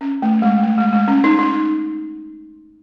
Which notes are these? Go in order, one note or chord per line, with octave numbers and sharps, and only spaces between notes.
C#4
A3
G#3
A3
G#3
G#3
C#4
D#4
D#4